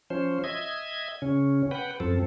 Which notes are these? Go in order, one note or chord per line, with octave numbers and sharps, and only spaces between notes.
F3 C#4 C5
D#5 E5 G#6
C#3 C#4
B4 F#5 G5
F#2 F3 C4 A4